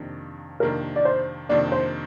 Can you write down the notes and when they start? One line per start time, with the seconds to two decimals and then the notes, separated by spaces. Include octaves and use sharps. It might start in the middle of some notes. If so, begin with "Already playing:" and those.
Already playing: F2 C3 D#3 A#3 D4
0.60 F2 C3 D#3 A#3 D4 A#4
0.96 D5
1.05 C5
1.49 F2 C3 D#3 A#3 D4 D5
1.72 C5